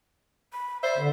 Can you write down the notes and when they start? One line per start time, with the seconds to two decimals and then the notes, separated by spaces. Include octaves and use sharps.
0.53 B5
0.83 C5 D5 E5
0.98 D3 B4